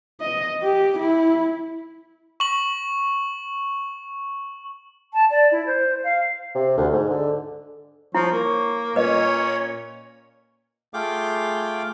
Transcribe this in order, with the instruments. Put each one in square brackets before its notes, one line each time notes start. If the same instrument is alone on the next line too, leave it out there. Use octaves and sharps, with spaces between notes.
[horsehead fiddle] D#5
G4
E4
[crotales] C#6 F#7
[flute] A5
D5
E4
C5
F5
[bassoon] C3
D2
G#2
D3
[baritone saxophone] F3 [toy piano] E4 [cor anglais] C#5
[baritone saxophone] A#3
[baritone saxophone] A#2 [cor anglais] C#4 [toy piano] B4 D#5 [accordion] C#5
[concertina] A3 F4 G#4 F5 G5 D6